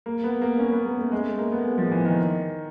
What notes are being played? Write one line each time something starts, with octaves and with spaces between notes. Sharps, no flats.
A#3
B3
A#3
C#4
B3
A#3
A3
G#3
A3
A#3
B3
G#3
F3
E3
D#3